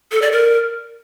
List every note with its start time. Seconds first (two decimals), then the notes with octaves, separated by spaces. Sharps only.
0.12 A4
0.22 D5
0.32 A#4